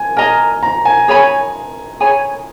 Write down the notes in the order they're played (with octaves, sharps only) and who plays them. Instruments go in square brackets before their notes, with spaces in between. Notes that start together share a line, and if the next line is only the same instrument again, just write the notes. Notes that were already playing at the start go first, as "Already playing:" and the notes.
Already playing: [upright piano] G#5
[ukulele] A#4 D#5 A#5 [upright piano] G#5
[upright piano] A#5
G#5
[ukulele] G#4 C#5 G#5 B5
G#4 C#5 G#5 B5